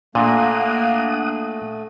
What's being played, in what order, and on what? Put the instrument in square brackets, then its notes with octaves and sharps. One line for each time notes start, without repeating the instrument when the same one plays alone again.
[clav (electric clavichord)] A#2 [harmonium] A3 [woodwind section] A#3 D4 [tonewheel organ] F#5 D#6